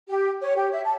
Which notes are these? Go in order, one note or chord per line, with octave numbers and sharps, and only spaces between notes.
G4
C#5
G4
E5
A5